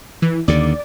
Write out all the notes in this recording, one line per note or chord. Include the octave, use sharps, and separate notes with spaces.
E3
D#2 D3 D5